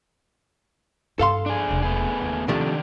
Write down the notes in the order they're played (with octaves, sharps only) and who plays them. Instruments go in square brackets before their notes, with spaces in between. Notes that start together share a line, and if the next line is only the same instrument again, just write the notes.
[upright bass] G2 [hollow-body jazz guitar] A4 F5 C6
[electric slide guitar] D4 G#4
[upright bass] E1 C3
[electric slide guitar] A3 B3 G#4
[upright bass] D#2
[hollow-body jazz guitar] C3 F3 A3 [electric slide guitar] D#3 D4